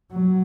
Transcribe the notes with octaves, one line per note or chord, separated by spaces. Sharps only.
F#3